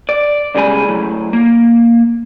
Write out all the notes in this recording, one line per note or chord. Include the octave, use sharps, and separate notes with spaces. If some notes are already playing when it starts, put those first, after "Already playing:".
D5
B1 C#3 G3 G#3 G#5 B5
A2 F#3
A#3